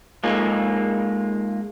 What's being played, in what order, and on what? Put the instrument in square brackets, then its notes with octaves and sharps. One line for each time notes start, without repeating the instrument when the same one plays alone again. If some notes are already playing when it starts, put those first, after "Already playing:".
[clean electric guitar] G#3 A#3 D#4 F4